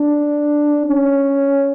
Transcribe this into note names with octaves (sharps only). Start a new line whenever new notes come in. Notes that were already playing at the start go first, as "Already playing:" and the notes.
Already playing: D4
C#4